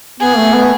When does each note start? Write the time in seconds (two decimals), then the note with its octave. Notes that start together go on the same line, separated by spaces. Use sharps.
0.20 B3 G#4
0.37 A3
0.54 B3